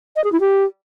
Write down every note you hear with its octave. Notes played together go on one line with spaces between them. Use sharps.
D#5
G#4
E4
G4